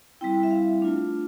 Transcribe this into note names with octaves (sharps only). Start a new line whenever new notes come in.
G3 C4 E4 G5
E5
F5
A3 D4 F4